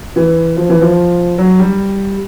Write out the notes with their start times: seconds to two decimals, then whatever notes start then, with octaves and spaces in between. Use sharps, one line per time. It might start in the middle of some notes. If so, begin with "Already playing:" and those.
0.16 E3
0.57 F3
0.69 E3
0.82 F3
1.38 F#3
1.59 G3